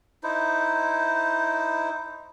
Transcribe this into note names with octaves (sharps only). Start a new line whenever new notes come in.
D#4 E4 C5